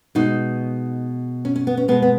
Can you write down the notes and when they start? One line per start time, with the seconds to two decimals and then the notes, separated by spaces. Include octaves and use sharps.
0.15 B2 G#3 D#4
1.45 C#4
1.56 C#4
1.67 B3
1.77 C#4
1.88 B2 G#3 B3
2.02 B3